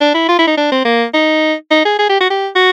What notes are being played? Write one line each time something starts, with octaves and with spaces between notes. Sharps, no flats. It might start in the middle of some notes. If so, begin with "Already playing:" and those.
D4
E4
F4
E4
D#4
D4
C4
A#3
D#4
D#4
G#4
G#4
G4
F#4
G4
F#4